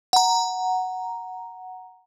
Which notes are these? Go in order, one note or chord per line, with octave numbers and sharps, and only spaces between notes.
F#5 A#5